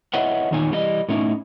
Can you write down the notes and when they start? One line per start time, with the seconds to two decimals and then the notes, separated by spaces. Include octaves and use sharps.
0.14 E4 B4 C#5 D#5 E5 F#5
0.51 E2 A#2 D#3 D#4 C#5 G#5
0.71 E3 G3 D#4 D#5
1.09 A2 A3 C#4 D#4 E4